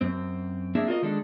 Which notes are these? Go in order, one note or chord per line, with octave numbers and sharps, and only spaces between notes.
F#2 C4
A#3 C4 D4 E4 G#4 E5
F4 F#4 A#4 D5 D#5
D#3 G#3 D4 G#4 A4